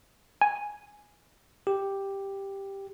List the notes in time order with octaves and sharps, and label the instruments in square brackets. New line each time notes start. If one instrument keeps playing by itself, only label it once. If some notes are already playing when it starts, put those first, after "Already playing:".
[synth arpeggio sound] G#5
[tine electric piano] G4